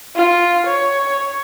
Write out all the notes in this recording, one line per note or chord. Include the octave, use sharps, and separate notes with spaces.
F4
C#5